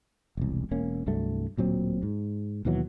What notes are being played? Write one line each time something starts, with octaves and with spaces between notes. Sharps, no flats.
E1 C2
E1 A#3 C#4
C2 G2 F#3 A3
D1 A#2 F#3 C4
G#2
D#2 B2 E3 F#3